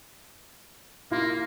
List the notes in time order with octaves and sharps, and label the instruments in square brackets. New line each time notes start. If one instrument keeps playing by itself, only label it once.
[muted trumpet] A#3 [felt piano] E4 F4